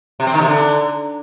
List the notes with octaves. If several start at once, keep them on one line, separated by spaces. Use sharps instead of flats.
C3
C4
D#3
C3
D3